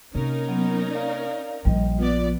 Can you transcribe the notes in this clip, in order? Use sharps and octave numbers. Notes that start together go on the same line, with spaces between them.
C3 A#3 C#4 D#4 A#4
F#3 B3
D5 F5
A#1 F3 G3 D#5
B3 F4 D5